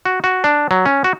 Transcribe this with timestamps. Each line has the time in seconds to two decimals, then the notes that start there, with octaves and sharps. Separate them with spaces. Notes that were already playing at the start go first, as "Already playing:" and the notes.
0.05 F#4
0.24 F#4
0.44 D4
0.71 F#3
0.86 C#4
1.04 F#4